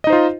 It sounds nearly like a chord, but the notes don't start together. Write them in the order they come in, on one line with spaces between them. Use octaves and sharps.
D#5 D#4 C5 F4